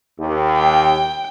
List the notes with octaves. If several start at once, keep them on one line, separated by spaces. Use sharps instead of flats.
D#2
G5